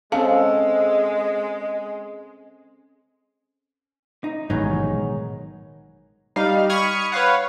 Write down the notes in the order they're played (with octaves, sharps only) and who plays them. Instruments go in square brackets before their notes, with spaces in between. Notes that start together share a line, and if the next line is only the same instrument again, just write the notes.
[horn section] G#3 [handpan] C4 C#4 A4 [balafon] F5 A5
[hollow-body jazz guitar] D#4
[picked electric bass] A1 G#2 [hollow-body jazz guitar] B2 D#4 [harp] D#3 F#3 G#3
[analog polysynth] G3 D#4 F5
B5 C#6 D#6 F6 G#6
B4 C#5 F5 F#5